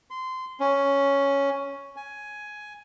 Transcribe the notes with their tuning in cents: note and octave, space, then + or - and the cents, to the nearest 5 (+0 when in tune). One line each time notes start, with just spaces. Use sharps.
C6 -20
C#4 +5
G#5 +10